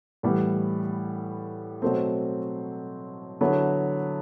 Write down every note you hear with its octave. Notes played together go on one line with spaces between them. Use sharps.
A2 E3 G3 B3
B2 F#3 A3 C4
D3 F#3 B3 E4